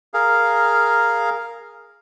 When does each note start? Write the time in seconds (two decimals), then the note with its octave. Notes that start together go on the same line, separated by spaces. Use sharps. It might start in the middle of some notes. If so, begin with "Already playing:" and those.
0.14 G#4 A#4 F5